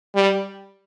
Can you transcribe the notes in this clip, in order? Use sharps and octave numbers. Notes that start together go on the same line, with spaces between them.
G3